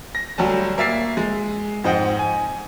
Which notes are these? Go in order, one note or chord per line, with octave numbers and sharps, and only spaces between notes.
A#6
D2 F#3 G3 A5
A#3 E5 A6 C7
G#3
F2 G#2 C5 D#5 F#5 G5
G#5